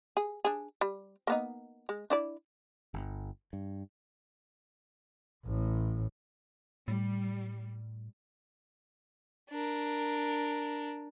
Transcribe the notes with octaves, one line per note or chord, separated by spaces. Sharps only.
G#4
D4 G#4
G3
A#3 B3 D#4
G#3
D4 E4 D5
G1
G2
A1 A2
A2 G3
D4 A#4